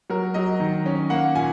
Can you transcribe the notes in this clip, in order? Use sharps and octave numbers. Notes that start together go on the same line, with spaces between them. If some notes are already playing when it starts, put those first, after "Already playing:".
F#3 A#4
F#3 D#5
D#3
C#4
A#3 F#5
A#2 G#5